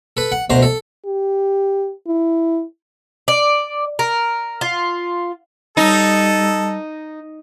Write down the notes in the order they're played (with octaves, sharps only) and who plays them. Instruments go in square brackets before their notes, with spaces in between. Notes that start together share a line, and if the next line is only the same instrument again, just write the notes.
[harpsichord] A4 B4
F#5
D2 B2 C5 A#5
A4
[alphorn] G4
E4
[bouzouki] D5
A#4
F4
[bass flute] G3 [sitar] D#4 [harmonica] A4